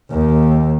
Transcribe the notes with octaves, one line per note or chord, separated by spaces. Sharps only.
D#2